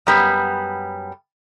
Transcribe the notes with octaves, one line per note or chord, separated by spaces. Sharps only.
F#2 G3 B3